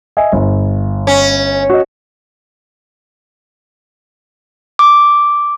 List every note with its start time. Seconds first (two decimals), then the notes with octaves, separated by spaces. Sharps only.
0.17 D#5 E5 G#5
0.32 G1
1.07 C#4
1.70 F#4 D#5
4.79 D6